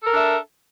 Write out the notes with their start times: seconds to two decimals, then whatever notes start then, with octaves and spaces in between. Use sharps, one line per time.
0.02 A4
0.07 A#4
0.12 D4
0.17 E5